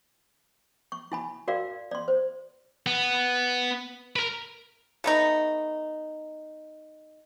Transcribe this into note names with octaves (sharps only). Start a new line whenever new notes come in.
C#6
E4 G#5 B5
F#4 A#4 D5 F5
D5 C6
C5
B3
A#4 B4
A3 B3 D#4